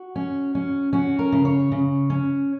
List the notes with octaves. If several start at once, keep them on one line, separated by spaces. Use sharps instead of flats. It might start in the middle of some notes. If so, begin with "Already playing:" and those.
Already playing: F#4
C#4
C#4
C#4 F#4
A#4
C#3
C#5
C#3
C#4